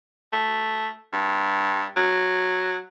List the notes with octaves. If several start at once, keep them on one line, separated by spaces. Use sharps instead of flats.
A3
G2
F#3